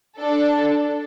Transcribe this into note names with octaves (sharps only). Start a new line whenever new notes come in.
D4 A4